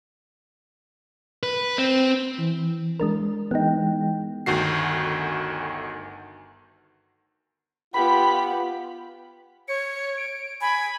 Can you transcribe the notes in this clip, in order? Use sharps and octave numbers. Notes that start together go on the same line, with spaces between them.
B4
C4
E3
G#3 D4 A#4
E3 G#3 B3 D#4 G5
G1 D2 D#3 F#4 C7
B3 F4 G4 B5
C#5 C#7
D7
G#5 B5